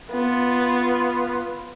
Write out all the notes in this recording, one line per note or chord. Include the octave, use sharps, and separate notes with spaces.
B3 F4